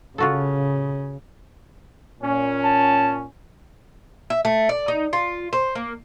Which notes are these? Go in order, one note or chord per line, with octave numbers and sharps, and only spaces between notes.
C#3 F4 F#4 A4
A#2 C#4
A5
E5
A3
D5
D#4
F4
C5
A#3